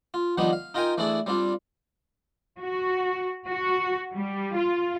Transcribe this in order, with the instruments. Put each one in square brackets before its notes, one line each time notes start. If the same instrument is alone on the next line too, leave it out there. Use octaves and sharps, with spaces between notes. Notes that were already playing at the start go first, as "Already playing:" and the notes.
[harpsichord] F4
D#3 F3 G3 B3 D4 D#4
F5
D#4 F4 A#4 F5 G5 G#5
E3 A3 D4 E4 G#4 D5
G3 C4 D4 F4
[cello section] F#4
F#4
G3
F4